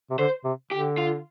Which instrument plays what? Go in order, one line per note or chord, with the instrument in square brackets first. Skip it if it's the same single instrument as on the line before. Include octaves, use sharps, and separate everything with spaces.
[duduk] C3
[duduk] D3 [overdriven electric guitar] C5
[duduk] C3
[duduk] D3 [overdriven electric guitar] G4
[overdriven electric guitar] F4